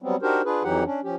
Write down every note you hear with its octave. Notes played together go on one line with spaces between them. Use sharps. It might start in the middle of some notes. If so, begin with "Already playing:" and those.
F#3 G3 B3 C4
D4 D#4 F#4 G4 A#4 C5
D4 F4 G#4 B4
F2 E3 F#3 D#4 G4 F#5
C#4 D4
F3 C#4 G4